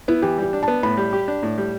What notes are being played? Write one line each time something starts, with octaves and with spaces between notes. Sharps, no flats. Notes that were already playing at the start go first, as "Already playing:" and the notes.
B3 E4
E3 G4
G3 G4
D4
A5
B3
A2 B5
G3
G4
D4
A2
G3